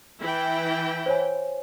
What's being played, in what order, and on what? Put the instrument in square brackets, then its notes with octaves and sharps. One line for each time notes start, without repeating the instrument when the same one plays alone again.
[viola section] E3 E4 G5
[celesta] C5 C#5 G#5